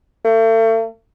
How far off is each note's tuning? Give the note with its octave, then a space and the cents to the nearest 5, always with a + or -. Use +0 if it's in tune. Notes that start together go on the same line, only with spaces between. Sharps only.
A3 +40